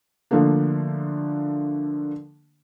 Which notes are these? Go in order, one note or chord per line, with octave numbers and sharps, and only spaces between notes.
D3 F3 A3 A#3 D4